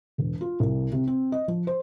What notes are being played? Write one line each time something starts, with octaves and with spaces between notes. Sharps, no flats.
E1
F4
C2
C3
C4
D#5
F3
C5